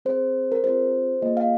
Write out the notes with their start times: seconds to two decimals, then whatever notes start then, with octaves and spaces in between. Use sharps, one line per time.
0.05 C4 G#4 C5
0.52 A#4
0.64 C4 F4 G#4 C5
1.22 A#3 F4 G#4 D#5
1.37 F5